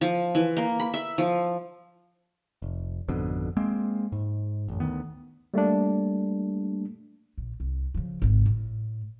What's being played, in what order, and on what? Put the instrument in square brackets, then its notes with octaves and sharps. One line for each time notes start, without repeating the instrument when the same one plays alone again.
[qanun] F3
E3
A#3
B5
E5
F3
[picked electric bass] F1
G#1 F2 B2 D3
G#3 A#3 C4
G#2
A1 F#2
D2 D#3 B3
[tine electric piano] G3 A3 A#3 D4
[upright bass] A#1
C2
C#3 F3
G#1 C#2
A2